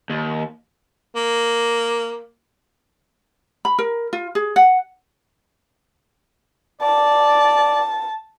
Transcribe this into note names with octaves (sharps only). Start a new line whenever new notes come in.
D#2
A#3
B5
A#4
F4
G#4
F#5
D5 A5